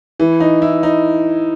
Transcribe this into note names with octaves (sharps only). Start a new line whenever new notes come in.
E3
D#4
E4
D#4